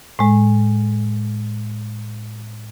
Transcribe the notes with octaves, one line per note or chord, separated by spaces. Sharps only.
A2 G#3